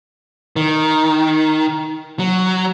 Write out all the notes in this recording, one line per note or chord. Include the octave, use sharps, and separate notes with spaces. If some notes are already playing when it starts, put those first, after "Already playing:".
D#3
F#3